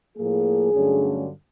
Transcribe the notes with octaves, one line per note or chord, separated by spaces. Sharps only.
A2 F3 A#3 G#4
G2 D3 F#3 A3 C#4